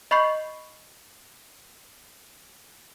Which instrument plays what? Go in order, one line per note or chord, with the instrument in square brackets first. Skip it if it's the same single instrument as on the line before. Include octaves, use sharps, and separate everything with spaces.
[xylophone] D#5 B5 C#6 G6 C7